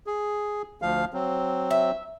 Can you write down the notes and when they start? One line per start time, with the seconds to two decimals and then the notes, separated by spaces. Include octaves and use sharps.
0.07 G#4
0.82 D2 F3 F5
1.13 F#3 C4
1.71 E5